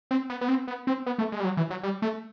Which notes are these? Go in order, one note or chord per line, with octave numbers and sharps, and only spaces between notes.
C4
B3
B3
C4
B3
C4
B3
A3
G#3
G3
F#3
E3
F#3
G3
A3